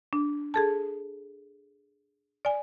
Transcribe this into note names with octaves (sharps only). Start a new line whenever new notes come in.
D4
G#4 A4 A5
D5 G#5